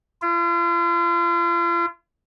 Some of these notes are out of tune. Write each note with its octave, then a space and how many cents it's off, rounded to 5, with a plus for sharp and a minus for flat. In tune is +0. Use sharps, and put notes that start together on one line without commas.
F4 -40